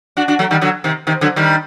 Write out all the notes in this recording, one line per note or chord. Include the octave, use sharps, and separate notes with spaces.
D4 F#4
D4 F#4
F#3 A3
D#3 G3
D3 F#3
C3 D#3
C3 D#3
D3 F#3
D#3 G3